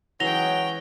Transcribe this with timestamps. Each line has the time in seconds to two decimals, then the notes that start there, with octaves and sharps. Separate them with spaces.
0.20 E3 F#3 G#3 C#4 G5 A#6 F7 G7